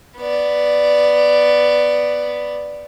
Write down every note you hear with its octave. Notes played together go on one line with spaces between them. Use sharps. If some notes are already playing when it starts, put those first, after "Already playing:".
B3 D5